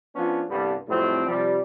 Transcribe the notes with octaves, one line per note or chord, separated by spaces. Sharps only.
F3 B3 C#4 D4 F4
C2 G2 D3 G3 B3
F2 A2 F#3 G3 C4
C3 F3 G3